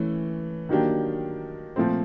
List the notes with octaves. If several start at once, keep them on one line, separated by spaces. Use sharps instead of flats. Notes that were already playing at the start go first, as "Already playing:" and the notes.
Already playing: E3 A3 C#4
D#3 F#3 A#3 D4 G4
A#2 F3 A3 C4